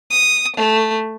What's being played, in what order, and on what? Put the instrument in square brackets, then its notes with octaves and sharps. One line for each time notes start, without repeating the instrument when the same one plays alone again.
[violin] D#6
A3